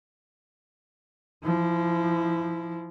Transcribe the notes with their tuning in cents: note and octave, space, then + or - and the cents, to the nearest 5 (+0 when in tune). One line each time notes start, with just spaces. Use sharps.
F3 -20 E4 +0